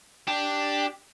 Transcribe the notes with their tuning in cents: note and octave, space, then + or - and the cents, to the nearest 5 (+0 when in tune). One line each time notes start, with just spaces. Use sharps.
D4 +0 G4 +0